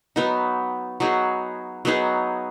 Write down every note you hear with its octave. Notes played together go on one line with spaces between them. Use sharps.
F#3 B3 D#4
F#3 B3 D#4 G#4
F#3 B3 D#4 G#4